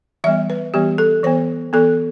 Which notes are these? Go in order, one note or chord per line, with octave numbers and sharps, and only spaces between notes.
E3 G3 B3 E5
B4
E3 G3 B3 G4
A4
E3 B3 C5
E3 B3 A4